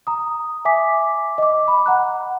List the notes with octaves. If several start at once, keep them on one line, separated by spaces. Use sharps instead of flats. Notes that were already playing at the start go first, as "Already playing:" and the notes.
A#5 D#6
E5 G#5 D6 B6
D#5 D6
B5
F#5 A#5 F#6